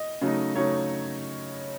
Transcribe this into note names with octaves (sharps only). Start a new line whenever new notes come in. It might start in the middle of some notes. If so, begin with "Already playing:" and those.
Already playing: D#5
C#3 F#3 A3 D#4
C#3 F#3 A3 D#4 C#5